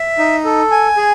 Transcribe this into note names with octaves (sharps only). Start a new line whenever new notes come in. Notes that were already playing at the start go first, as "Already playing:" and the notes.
Already playing: E5
D#4
A4
G#5
G#4